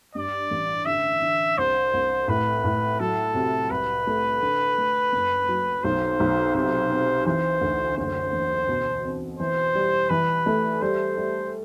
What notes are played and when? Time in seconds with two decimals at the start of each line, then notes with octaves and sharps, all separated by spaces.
0.15 G2 D5
0.51 A1
0.86 D3 E5
1.22 D3
1.58 C2 C5
1.93 C2
2.28 A2 B4
2.64 A2
3.00 F#3 A4
3.35 C3
3.71 C2 B4
4.07 A3
4.41 D3
4.78 A3
5.13 F#1
5.48 F#3
5.83 B1 C5
6.20 B1
6.54 C3 C5
6.90 C4
7.26 E3 C5
7.62 D2
7.97 F#1 C5
8.33 E2
8.68 B2
9.04 C4
9.39 E3 C5
9.75 G3
10.10 E3 B4
10.46 A3
10.82 G3 C5
11.17 G3